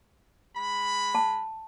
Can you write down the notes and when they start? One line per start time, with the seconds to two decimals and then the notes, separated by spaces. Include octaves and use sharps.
0.55 G#3 B5
1.15 A5